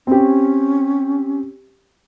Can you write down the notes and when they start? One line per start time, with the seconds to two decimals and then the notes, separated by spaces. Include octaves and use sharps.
0.07 C4 C#4 G4